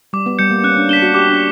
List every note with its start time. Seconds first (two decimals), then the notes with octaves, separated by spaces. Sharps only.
0.13 G3 D6
0.26 B3
0.39 G3 G6 C#7
0.51 A#3
0.64 C#4 F#6
0.77 D4
0.89 D4 B6 E7 G7
1.02 F#4
1.14 G4 D6
1.29 D4